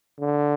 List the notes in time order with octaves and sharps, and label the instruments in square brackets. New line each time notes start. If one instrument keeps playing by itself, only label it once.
[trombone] D3